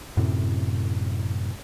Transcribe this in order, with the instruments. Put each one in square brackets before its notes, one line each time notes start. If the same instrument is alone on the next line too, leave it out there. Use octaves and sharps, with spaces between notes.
[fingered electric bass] F#2 A2 C3